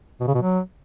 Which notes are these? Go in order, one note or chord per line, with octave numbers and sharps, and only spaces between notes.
B2
C#3
B2
F#3